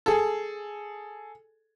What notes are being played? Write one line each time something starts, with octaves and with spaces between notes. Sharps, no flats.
G#4 A4